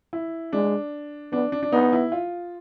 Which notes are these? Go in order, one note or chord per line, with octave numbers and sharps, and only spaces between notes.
E4
G#3 D4
B3 D4
D4
D4
B3 D#4
E4
F4